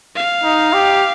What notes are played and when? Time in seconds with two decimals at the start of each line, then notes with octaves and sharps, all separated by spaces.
0.16 F5
0.44 D#4
0.73 G4